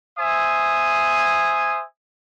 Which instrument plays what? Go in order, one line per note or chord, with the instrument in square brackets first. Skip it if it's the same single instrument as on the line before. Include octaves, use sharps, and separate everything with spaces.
[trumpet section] C5 E5 G#5 D#6